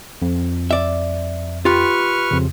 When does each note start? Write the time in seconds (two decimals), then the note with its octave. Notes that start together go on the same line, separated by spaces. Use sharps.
0.22 F2
0.71 D5 E5
1.65 F4 G4 B4 C#6 F6
2.31 F2 C#3